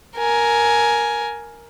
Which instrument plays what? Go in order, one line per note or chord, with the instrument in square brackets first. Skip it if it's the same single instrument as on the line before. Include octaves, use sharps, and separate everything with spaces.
[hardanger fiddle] A#4 G#5